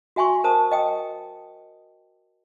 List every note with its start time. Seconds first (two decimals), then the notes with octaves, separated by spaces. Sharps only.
0.16 F#4 E5 G#5 C6 C#6
0.44 A#4 C5 A5 D#6
0.72 D#5 G5 D#6